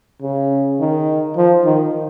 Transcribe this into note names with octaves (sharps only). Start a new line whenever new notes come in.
C#3
D#3
F3
D#3